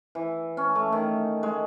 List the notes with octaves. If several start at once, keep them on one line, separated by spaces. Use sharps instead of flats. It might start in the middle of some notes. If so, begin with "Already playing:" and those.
E3
C#4
A3
D#3
G#3